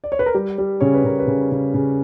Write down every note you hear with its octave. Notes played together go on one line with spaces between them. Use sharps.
D5
C#5
B4
A#4
G3 G4
G3
C#3 C#5
B4
C#3 A#4
B4
C#3
C#3
C#3